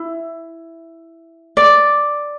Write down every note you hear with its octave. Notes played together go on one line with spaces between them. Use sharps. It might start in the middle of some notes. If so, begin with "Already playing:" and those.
Already playing: E4
D5